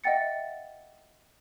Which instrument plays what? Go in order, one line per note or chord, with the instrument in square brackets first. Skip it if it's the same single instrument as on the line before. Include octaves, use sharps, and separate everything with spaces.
[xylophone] D#5 E5 F#5 G5 A6 C#7